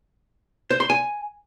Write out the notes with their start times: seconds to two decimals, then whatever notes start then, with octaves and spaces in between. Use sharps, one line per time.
0.70 C5
0.80 C6
0.90 G#5